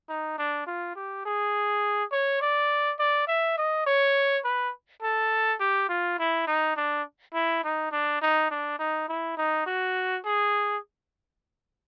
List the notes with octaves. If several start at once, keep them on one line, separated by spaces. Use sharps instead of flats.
D#4
D4
F4
G4
G#4
C#5
D5
D5
E5
D#5
C#5
B4
A4
G4
F4
E4
D#4
D4
E4
D#4
D4
D#4
D4
D#4
E4
D#4
F#4
G#4